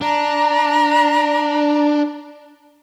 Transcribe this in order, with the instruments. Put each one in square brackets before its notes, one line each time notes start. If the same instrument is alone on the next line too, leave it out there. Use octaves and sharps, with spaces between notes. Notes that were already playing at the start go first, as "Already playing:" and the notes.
[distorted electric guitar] D4 [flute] A#5